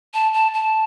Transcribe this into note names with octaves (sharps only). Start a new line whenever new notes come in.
A5
A5
A5